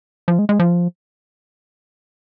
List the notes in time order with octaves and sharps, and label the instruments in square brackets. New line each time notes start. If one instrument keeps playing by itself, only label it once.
[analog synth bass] F3
G#3
G#3
F3